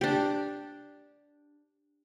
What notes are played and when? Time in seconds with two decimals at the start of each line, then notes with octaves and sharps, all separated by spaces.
0.01 D4 G4